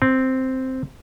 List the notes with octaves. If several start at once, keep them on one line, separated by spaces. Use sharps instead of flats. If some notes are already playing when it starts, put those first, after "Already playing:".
C4